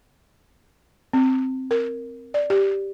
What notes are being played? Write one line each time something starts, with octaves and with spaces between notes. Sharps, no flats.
C4
A#4
D5
G4